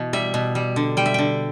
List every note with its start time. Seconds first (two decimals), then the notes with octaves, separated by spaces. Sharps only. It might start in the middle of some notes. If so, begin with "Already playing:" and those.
Already playing: B2 E3
0.13 G3 E5
0.34 B2
0.55 G3
0.76 D3
0.97 G3 G5
1.06 E5
1.14 D3 G5